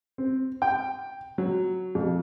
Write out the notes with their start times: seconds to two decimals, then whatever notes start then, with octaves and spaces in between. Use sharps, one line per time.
0.18 C4
0.62 G5
1.38 F#3
1.95 F2